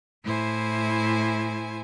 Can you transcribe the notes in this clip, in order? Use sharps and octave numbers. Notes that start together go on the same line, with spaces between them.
A2 E4 C5 G#5